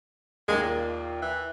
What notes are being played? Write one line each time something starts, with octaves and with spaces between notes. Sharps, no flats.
D#2 G#3 A#3
A#2
E3